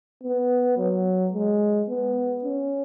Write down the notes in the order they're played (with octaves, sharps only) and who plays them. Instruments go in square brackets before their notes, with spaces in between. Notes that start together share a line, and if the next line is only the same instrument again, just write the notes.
[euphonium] B3
F#3
G#3
B3
C#4